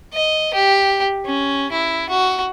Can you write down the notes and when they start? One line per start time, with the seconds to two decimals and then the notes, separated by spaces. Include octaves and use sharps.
0.13 D#5
0.54 G4
1.26 C#4
1.72 E4
2.09 F#4